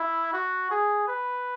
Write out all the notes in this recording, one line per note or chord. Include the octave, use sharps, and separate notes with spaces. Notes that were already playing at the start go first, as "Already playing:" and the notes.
Already playing: E4
F#4
G#4
B4